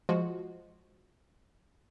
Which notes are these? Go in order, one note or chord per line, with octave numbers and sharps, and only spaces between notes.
F3 G#3 F4 F#4